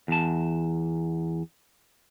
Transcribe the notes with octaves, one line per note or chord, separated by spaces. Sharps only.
E2 A5